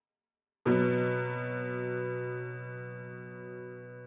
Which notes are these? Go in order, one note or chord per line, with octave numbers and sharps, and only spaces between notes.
B2 F#3 B3